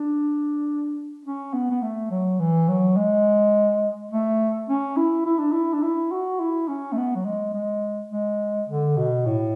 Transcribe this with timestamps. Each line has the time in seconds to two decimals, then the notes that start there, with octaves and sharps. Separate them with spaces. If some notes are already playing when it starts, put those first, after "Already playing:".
Already playing: D4
1.25 C#4
1.53 B3
1.71 B3
1.82 A3
2.11 F#3
2.39 E3
2.68 F#3
2.96 G#3
4.11 A3
4.69 C#4
4.96 E4
5.26 E4
5.39 D4
5.52 E4
5.73 D4
5.82 E4
6.11 F#4
6.40 E4
6.68 C#4
6.92 A3
6.97 B3
7.15 F#3
7.25 G#3
7.53 G#3
8.11 G#3
8.69 D3
8.97 B2
9.26 A2